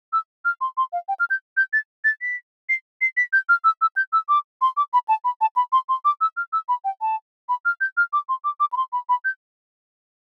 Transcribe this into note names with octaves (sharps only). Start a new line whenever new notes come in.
E6
F6
C6
C6
F5
G5
F6
G6
G6
A6
A6
B6
C7
C7
B6
G6
F6
E6
E6
G6
E6
D6
C6
D6
B5
A5
B5
A5
B5
C6
C6
D6
E6
F6
E6
B5
G5
A5
B5
F6
G6
F6
D6
C6
D6
D6
B5
C6
B5
B5
G6